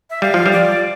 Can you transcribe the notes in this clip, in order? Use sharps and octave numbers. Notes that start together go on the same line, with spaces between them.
E5
G3 F5
F3
G3
D5